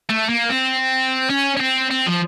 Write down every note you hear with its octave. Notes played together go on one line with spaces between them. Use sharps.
A3
A#3
C4
C#4
C#4
C4
C4
F3